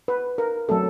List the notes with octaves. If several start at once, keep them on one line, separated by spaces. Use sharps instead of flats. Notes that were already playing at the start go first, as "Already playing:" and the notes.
B4
A#4
F#3 A3 C4 A4